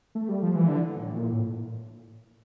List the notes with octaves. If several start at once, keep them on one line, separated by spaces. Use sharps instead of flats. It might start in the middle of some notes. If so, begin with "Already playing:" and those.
A3
G3
F3
E3
D3
A#2
A2
A#2
A2